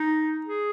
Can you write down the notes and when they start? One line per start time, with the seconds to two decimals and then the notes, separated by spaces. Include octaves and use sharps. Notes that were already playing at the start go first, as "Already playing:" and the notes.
Already playing: D#4
0.46 G#4